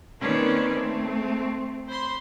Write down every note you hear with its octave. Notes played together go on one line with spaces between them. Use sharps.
D#3 A#3 C4 C#4 B4 D5
A3 C4
C5 B5 C6